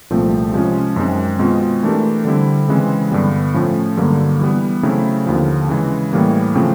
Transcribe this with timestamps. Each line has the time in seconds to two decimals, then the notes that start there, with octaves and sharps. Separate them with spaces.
0.11 C2 A#2 F3 A3 C4
0.53 C3 F3 G#3 C#4
0.96 F#2 D#3 G#3 C4
1.39 B2 G#3 C4 F4
1.83 E3 A3 D4 G4 A#4
2.25 D3 G3 C4 E4
2.68 C#3 E3 G#3 C4
3.12 G2 D3 G3 B3
3.54 A2 F3 A3 C#4
3.97 G2 D3 F#3 A#3
4.41 E3 G3 B3
4.83 C#3 F#3 A3 C4 E4
5.26 D#2 D3 F3
5.69 C#3 E3 G#3
6.13 A2 E3 G3 A#3
6.55 C#3 F3 A3 C4